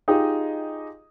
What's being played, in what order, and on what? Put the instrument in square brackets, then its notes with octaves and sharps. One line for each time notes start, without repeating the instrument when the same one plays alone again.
[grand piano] D#4 F4 G4 G#4 D#5